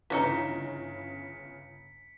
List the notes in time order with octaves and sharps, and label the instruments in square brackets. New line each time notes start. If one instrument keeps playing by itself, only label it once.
[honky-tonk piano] G1 C#3 [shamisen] E3 C#4 D#4 [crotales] B6 C#7